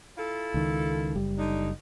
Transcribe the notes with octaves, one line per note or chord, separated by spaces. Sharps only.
E4 F4 A4
C#2 D#3
F#1 G3
D3 D4 D#4